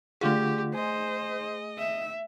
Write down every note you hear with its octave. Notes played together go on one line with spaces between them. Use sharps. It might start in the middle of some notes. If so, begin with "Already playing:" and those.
D3 A3 F4 G4 G#4 F#5
C5 D#5 G#5
E5